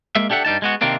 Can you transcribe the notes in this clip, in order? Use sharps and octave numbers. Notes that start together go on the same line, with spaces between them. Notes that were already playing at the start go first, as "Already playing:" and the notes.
G#3 A#3 E5
D4 G4 A4 E5 F#5
G2 G3 D#4 A5
G#3 B3 F#4
C3 D#3 A#3 C4 D4